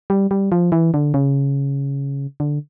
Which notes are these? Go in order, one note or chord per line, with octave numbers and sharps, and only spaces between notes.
G3
G3
F3
E3
D3
C#3
D3